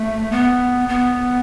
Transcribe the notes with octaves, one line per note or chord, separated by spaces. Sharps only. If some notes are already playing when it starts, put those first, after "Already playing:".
Already playing: A3
B3
B3